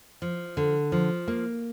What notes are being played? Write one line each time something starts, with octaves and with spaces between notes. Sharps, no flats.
F3
D3
F3
A#3